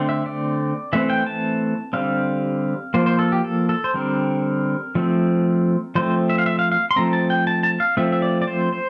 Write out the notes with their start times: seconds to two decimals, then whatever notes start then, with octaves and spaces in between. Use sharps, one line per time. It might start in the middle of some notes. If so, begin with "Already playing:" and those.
Already playing: D3 A3 C4
0.09 E5
0.26 D5
0.93 E3 A3 C4 E5
1.10 G5
1.27 A5
1.93 D3 G3 C4 F5
2.94 F3 A#3 C5
3.06 C5
3.19 A4
3.32 G4
3.44 A4
3.69 A4
3.84 C5
3.94 D3 G3 C4 A#4
4.95 F3 A3 C4
5.95 F3 A3 C4 C5
6.30 E5
6.38 F5
6.46 E5
6.59 F5
6.72 F5
6.91 C6
6.96 F3 A3 C4 A#5
7.13 A5
7.30 G5
7.47 A5
7.63 A5
7.80 F5
7.97 F3 A3 C4 E5
8.12 E5
8.22 D5
8.42 D5
8.47 C5
8.73 C5